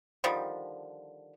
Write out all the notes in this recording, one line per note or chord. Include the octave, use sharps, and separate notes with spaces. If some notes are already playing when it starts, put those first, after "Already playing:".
D3 D#3 F3 G3